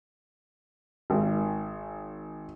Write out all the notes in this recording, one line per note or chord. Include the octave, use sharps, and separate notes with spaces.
G#1